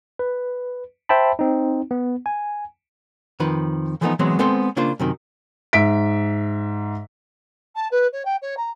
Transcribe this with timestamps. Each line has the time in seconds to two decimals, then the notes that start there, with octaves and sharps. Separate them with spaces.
0.19 B4
1.09 C5 E5 G5 A5 B5
1.39 C4 D#4
1.91 B3
2.26 G#5
3.40 F2 D#3 F3 B4
4.01 E3 F3 G3 A3 B3 D#4
4.19 E3 F#3 G#3 B3 C4
4.39 G#3 B3 C4 A4 C5
4.76 C#3 A#3 D4 F4 C5
5.00 F#2 C3 D#3
5.73 G#2 E5 B6 D7
7.75 A5
7.91 B4
8.12 C#5
8.25 G5
8.42 C#5
8.57 A#5